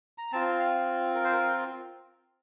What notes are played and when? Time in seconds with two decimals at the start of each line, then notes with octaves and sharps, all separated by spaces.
0.18 A#5
0.32 C4 F4 A5
0.60 F5
1.15 A#4
1.24 C5
1.33 A#4